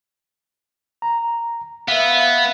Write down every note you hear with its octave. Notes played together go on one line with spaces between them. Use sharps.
A#5
B3 B4 E5 F5